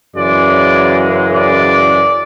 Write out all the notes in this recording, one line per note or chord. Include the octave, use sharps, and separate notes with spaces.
F#2 C#3 E3 G#3 D5
D5